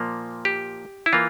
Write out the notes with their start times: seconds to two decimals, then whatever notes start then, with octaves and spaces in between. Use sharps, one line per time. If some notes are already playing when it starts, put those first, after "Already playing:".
Already playing: A#2 F3 A#3
0.45 G4
1.06 E4
1.13 E3 A#3 F4